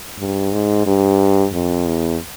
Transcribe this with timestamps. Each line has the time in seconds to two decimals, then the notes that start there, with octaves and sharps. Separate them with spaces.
0.19 G2
0.52 G#2
0.86 G2
1.53 F2
1.86 E2